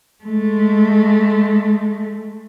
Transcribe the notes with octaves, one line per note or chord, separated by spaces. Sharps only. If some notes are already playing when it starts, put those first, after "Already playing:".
G#3 A3